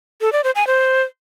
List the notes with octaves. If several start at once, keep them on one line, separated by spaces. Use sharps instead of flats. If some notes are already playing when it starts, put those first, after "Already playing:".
A4
D5
C5
G#5
C5